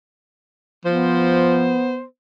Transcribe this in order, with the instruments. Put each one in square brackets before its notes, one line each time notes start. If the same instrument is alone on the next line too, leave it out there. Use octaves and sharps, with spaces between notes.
[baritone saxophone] F3 [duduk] B3 [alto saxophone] C5